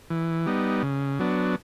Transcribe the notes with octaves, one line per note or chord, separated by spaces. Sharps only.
E3
G3 B3 D#4
C#3
F#3 B3 D4